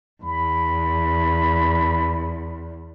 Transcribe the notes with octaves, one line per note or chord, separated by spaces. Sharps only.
E2 B5